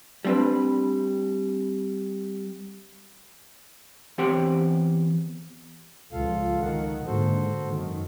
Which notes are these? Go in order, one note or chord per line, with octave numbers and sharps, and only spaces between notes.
G3 A3 C4 D4 B4
E2 C4 G4 C5 F#5 G5
C#2 F3 F4 A4 F5
D#3 F#5
G#2 D3 A#3 F#4 A4 C5
F#2 D#3